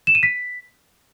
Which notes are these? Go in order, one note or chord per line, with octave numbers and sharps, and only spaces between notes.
E7
D#7
B6